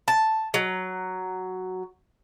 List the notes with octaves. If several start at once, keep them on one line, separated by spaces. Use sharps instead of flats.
A5
F#3